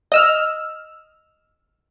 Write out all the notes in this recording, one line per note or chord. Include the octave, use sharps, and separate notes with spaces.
D#5 E6 F6